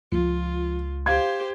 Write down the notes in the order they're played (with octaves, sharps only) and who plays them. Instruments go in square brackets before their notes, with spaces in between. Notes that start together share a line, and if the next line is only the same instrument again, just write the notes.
[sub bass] C#2 [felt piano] F3 [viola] F4
[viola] G4 C5 [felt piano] F5 G#6